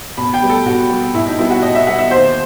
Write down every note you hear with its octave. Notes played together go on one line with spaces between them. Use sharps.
B2 B5
G5
G3 B3
A4
B2 F#4
G3 B3
B2 E4
D#4
G3 B3 E4
F#4
B2 D#5
E5
G3 B3 F#5
E5
D#2 C5